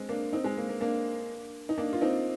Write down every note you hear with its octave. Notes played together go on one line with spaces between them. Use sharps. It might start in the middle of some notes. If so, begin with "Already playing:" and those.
Already playing: G#3 C4
A#3 D4
C4 D#4
G#3
A#3
A#3
A#3 D4
D#4
A#3 D4
F4
C4 D#4